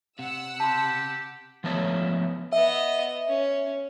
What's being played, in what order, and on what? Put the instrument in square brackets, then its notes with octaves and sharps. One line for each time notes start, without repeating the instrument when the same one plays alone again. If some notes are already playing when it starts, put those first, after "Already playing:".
[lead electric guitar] C3 [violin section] F#5 E6
[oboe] G4 [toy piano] A5 B5 C6
[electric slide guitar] F3 A3 B3 A4 C#5
[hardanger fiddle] B3 D#5 [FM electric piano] E5
[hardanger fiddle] C#4